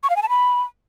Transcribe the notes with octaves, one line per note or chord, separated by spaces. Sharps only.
C#6
F5
G#5
A5
B5